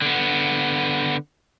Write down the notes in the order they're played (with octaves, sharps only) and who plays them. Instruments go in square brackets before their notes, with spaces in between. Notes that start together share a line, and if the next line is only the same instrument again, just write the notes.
[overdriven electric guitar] D3 B3